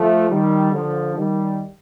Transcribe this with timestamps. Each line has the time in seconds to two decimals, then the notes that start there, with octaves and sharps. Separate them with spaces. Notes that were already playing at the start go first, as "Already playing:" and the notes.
Already playing: F3 A3
0.29 D#3 G3
0.72 D3 F3
1.16 D#3 G3